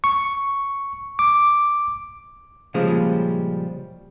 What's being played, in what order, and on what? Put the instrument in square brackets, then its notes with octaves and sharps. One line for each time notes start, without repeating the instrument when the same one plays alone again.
[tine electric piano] C#6
D6
[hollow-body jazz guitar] A#2 C#3 F3 G3 G#3